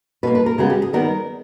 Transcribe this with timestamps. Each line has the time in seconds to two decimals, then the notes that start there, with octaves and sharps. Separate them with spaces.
0.23 B2 B4
0.27 A#3
0.35 B4
0.46 A#4
0.58 C#3 G#3 B3 G#4
0.70 G4
0.82 G#4
0.93 D#3 G3 B3 A#4